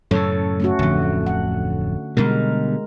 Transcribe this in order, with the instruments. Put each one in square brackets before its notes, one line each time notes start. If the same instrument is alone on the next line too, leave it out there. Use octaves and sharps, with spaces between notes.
[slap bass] F#2 A2 C#3 [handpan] A4 C#5
[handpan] A3 C#4 F#4
[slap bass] D1 F2 [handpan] D3
[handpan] F#5
[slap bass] B2 D3 G3 [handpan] G#3 A#4